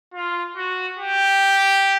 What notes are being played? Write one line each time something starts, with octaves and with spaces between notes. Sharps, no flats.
F4
F#4
G4